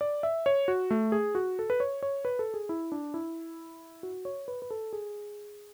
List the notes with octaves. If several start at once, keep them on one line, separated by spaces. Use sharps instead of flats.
D5
E5
C#5
F#4
A3
G#4
F#4
A4
B4
C#5
C#5
B4
A4
G#4
E4
D4
E4
F#4
C#5
B4
B4
A4
G#4